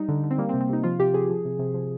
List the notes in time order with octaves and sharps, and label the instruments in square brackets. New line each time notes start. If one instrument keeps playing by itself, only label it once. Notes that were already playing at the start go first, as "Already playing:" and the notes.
Already playing: [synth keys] G3 D#4
D3
D3
C4
G3 A#3
C4
C3
C4
C3 D#4
F3 F4
C3 G4
C3 G#4
F3
C3
C3
F3